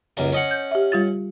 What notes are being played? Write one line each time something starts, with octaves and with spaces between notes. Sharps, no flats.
C#2 F#2 A#3
C#4 D#5 F#5
G6
G4 E5
G3 F4 A6